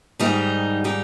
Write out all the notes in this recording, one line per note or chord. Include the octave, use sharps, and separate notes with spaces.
G#2 D#3 G3 D#4 G4
D#4 G4